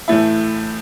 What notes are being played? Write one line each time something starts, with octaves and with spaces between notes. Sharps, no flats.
A2 E3 A3 E4